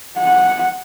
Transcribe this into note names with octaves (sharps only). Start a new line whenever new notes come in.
F#5